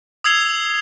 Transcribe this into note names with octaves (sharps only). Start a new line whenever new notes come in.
D#6 E6 G#6 C7 F7 G7